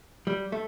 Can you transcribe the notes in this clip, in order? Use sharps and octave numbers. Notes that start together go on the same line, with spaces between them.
G3
A3